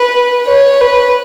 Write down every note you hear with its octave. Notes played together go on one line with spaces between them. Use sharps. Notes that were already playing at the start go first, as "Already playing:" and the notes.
Already playing: B4
C#5
B4